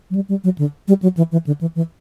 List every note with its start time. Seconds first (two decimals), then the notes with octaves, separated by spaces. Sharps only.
0.10 F#3
0.15 G3
0.29 G3
0.44 F#3
0.58 D3
0.88 G3
1.02 F#3
1.17 E3
1.32 E3
1.46 D3
1.61 E3
1.75 E3